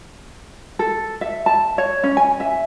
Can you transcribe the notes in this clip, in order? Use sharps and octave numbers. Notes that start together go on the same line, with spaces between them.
A4
E5
A5
C#5
C#4
G#5
E5